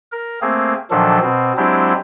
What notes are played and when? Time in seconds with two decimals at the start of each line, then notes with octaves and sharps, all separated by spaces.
0.12 A#4
0.42 A3 A#3 C4 G#4
0.91 A#2 D#3 F3 F#3 D4 A4
1.22 B2 C4
1.57 F#3 G#3 C4 D4 E4 G4